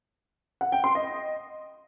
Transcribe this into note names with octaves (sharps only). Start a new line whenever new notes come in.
F#5
G5
C6
D#5